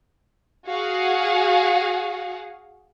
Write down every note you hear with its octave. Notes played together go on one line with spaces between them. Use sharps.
F#4 G#4 F5 F#5